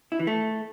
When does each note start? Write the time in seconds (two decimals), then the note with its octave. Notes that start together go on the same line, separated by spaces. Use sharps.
0.12 E4
0.20 E3
0.27 A3